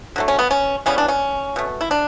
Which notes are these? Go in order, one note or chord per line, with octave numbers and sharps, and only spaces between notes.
D3 F#3 A3
C#4
B3
C#4
C#3 E3 G3 B3 C#4
D4
C#4
B2 A3
E4
D4